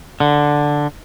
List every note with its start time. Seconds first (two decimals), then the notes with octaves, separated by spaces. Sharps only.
0.20 D3